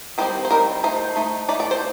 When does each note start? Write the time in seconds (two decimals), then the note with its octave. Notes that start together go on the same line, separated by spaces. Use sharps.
0.18 D#3 G3 C4 D#4 C5
0.45 C5
0.50 D#3 G3 C4 D#4 A#4
0.83 A3 D#4 C5
1.16 A3 D#4
1.49 A3 D#4 D5
1.60 D5
1.71 C5